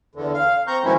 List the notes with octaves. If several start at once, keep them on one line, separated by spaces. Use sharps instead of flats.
E2 D3
F5
C4 A#5 C#6 G6
B2 D#3 F3 G#3 C#4 E4